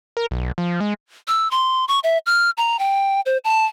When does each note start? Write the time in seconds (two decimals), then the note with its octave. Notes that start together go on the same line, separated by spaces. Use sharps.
0.17 A#4
0.31 B1
0.58 F3
0.80 G#3
1.28 E6
1.51 C6
1.88 C#6
2.04 E5
2.26 F6
2.58 A#5
2.79 G5
3.26 C5
3.44 A5